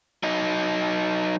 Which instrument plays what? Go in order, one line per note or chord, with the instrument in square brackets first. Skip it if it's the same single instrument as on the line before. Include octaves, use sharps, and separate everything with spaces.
[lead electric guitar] F#3 D#4